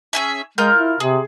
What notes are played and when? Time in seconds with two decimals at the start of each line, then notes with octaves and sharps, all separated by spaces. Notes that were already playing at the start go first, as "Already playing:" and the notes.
0.13 C#4 G#4 E5
0.58 G#3 F4 A#4 G6
0.77 E4
1.00 C3 G#4